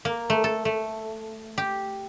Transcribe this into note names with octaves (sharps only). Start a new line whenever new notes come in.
A#3
A3
A4
A3
G4